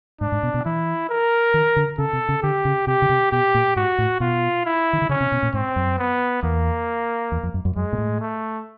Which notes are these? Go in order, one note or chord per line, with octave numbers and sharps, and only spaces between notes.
G#2 D4
G#2
B2
B2
E3 E4
A#4
D#3
D3
C#3 A4
C3
C#3
D3 G4
C#3
C3 G4
C#3
C3
B2 G4
A#2
G#2 F#4
A2
B2 F4
E4
D#3
D3
C#3 C#4
C3
B2
A#2
G#2 C4
F#2
B3
E2 A#3
E2
F2
F#2
F#2
F#2 G#3
A#2
A2
A3